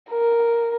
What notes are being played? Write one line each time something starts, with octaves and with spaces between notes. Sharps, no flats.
A#4